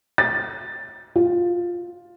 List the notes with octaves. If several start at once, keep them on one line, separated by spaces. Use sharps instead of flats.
A6
F4